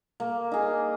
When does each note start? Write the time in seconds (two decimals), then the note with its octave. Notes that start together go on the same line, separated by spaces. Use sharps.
0.20 A#3
0.52 D#4 G#4